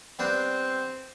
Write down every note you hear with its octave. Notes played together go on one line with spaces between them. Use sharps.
G3 B3 C4 D4